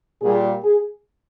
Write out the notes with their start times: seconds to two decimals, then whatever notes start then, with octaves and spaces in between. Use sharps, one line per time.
0.21 A#2 G3 G#4
0.63 G#4